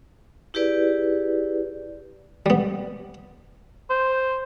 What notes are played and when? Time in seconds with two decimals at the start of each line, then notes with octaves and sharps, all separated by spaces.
0.54 E4 G4 G#4 B4 D5
2.46 G3 B3
3.90 C5